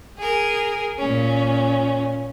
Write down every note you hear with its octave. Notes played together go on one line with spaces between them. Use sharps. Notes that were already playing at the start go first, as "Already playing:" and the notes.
G#4 A#4
A#2 C#4